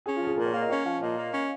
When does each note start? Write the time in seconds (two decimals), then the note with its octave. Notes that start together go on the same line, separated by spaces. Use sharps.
0.06 C#4 G#4
0.16 F4
0.22 F3
0.27 G#4
0.37 A#2 A#4
0.46 C#5
0.54 A#3 F5
0.62 D#5
0.70 C#4 C#5
0.86 F3 F5
1.02 A#2 D#5
1.18 A#3
1.34 C#4